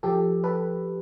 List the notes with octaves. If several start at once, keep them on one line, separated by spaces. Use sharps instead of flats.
F3 G4 A4
A4 B4